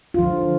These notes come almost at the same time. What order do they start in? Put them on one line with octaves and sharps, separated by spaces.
F4 F3 D3